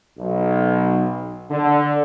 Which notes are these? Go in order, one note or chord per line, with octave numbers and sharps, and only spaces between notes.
B1
D3